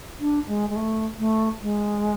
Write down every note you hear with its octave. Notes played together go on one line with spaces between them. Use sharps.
D4
G#3
G#3
A3
A3
G#3